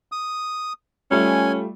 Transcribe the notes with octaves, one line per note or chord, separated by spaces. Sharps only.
D#6
G3 A3 C#4 F4 G#5